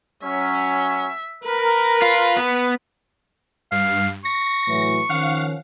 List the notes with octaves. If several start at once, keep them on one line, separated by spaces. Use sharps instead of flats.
F#3 C#4 E5
A#4 B4
F4
B3
G2 F5
C#6 A#6
A2 E3 F#3
D#3 F3 C#4 F5 F#5